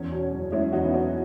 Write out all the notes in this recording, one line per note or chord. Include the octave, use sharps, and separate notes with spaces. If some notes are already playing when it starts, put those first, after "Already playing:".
Already playing: E2 C#4
B2
F#1
G#3 C#4 E4
E2 D#4 F#4
B3
B2 C#4